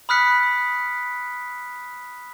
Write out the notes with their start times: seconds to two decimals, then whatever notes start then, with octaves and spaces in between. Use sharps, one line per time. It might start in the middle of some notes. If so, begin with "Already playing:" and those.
0.09 B5 D#6 F6 F#6 B6 C#7